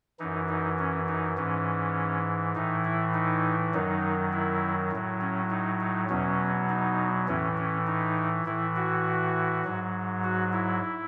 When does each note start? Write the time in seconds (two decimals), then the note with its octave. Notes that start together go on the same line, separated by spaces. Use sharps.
0.19 F#2 E3 D#4
0.48 D#4
0.79 C#4
1.08 D#4
1.37 G#2 E3 C#4
2.55 A2 E3 D#4
2.85 E4
3.14 D#4
3.73 F#2 D#3 F#3 D#4
4.33 E4
4.92 A2 F#3
5.21 C#4
5.50 D#4
5.80 D#4
6.09 E2 B2 F#3 C#4
6.69 D#4
7.28 A2 E3 C#4
7.58 C#4
7.87 D#4
8.45 A2 E3 E4
8.76 F#4
9.65 G#2 F#3
10.24 F#4
10.53 E4